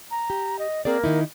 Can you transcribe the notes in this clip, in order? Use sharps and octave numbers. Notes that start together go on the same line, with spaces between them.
A#5
G4
D#5
A#3 C4 G#4 D5
D#3 D#4 E4